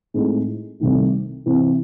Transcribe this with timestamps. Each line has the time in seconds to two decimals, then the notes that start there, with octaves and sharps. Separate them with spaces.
0.14 A2 G#3 C4 D#4
0.80 C2 C3 D#3 A3
1.46 C3 E3 C4